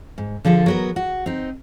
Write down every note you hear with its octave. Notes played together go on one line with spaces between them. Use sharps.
G#2
D3 F3 G#4 A4
F#3 B3 A#4
F#4
C4 D#4